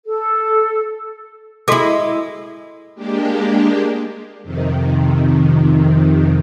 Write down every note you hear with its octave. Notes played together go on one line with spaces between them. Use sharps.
A4
G#3 E4 F#4 A4 D6
G#3 A#3 D4 G4
F2 C3 D#3